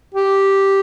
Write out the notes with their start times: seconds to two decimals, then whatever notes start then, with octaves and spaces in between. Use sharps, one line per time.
0.14 G4